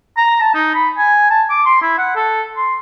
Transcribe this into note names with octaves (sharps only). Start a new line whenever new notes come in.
A#5
A5
D#4
B5
G#5
A5
D6
C6
E4
F#5
A4
C6